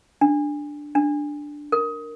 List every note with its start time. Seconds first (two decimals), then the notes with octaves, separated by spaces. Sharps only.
0.21 D4
0.95 D4
1.72 A#4